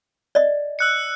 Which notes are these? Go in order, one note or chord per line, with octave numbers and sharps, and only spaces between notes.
D5 D#5
E6 F#6 C#7